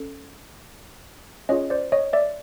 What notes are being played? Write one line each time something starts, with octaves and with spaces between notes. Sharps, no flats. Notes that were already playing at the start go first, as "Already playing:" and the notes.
Already playing: C#4 A4
C#4 F4 G#4 C#5 D#5
C5 D5
C#5 D#5
D5 E5